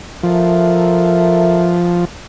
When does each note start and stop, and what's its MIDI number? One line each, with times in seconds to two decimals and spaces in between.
0.23 2.05 53
0.23 1.77 69
0.23 1.77 70
0.23 1.77 76